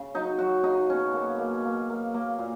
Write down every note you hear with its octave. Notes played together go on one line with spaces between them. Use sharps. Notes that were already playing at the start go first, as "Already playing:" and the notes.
Already playing: C#3
F#3 D#4
F#3 F#4
C#3 D#4
B2 C#4
A#3
A#3
A#3
A#3
A#3
A#2